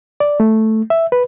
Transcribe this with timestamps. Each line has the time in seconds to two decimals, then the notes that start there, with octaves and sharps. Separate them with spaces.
0.20 D5
0.40 A3
0.90 E5
1.12 B4